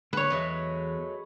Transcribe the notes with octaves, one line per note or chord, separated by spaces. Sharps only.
D3 G#3 A#3 B4 C#5
E2 F#3 G#3 A3